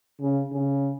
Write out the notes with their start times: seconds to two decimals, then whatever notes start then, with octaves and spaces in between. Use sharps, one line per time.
0.21 C#3
0.52 C#3